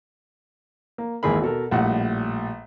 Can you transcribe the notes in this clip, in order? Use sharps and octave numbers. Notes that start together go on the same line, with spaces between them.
A#3
G#1 D#2 E3 G#4 A#4 B5
B2 A4 A#4
A#1 A2 G3 F#5